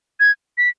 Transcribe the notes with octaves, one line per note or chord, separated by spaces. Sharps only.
G#6
B6